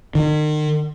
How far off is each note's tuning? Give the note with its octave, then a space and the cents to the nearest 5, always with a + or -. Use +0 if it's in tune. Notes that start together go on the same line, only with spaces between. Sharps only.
D#3 -40